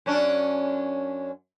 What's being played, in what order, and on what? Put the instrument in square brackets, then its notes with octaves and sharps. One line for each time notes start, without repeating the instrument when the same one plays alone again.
[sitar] F#2 C#4 D4